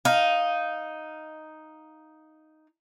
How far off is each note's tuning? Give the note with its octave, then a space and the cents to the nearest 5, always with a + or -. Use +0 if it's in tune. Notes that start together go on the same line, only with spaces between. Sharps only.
D#4 +0 F5 +5